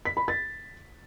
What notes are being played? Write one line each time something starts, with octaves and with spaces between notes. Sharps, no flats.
B6
B5
A6